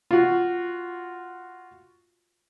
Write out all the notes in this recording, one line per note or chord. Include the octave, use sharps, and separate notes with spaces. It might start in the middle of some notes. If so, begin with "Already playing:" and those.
F4 F#4